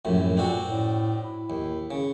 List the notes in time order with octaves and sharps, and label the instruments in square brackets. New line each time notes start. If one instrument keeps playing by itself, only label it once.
[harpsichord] A#1 F#2 A2
[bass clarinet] A#2 [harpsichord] C4 D4 F#4
[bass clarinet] A2
E4
[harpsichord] D#2
C#3